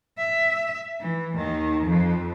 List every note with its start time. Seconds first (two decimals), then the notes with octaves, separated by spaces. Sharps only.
0.18 E5
1.01 E3
1.34 D#2 D#3
1.85 F2 F3